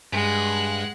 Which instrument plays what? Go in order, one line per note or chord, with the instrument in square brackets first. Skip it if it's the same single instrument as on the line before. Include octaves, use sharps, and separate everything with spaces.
[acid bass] G2 [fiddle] G#3 F#5